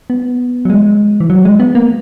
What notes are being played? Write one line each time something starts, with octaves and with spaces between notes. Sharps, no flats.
B3
F#3
G#3
E3
F#3
G#3
B3
A#3